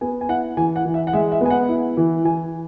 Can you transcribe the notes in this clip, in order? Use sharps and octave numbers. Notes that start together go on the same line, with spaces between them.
B3 G#5
G#5
E4 F#5
E3 G#5
F#5
E3
E5
F#5
G#3 E5
E5
B3 G#5
F#5
E4
E3
E3 G#5